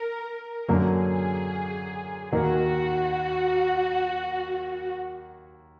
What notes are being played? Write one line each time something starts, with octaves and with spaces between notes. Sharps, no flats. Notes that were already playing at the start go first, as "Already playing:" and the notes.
Already playing: A#4
F#2 D3 F#3 A#3 G#4
D#2 D#3 A#3 F#4